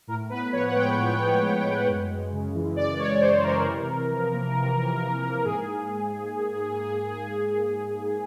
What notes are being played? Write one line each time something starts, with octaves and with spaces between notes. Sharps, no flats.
A2 A#4
B3 B4
F3 C#5
F#5
G#3 G5
A2
B3
F3
G#3
F#2
G#3
C#3
E3
F#2 D5
G#3 C#5
C#3 C5
E3 A#4
C3
C3
F3
A#3
C3
C3
F3
A#3
G#2 G#4